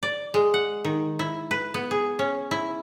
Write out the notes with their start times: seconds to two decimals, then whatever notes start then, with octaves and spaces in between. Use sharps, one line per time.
0.03 D5
0.34 G#3
0.54 F#5
0.85 D#3
1.19 E4
1.51 B4
1.74 B3
1.91 G#4
2.19 C#4
2.51 E4